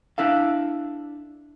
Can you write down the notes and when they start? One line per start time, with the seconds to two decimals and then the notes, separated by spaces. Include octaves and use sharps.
0.18 D4 E4 A4 F5